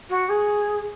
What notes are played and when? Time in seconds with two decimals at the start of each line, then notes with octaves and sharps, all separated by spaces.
0.09 F#4
0.29 G#4